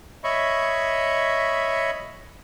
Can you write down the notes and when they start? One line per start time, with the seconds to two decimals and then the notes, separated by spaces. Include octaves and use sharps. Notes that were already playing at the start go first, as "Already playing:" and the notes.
0.24 C#5 D#5 E5 B5 C#6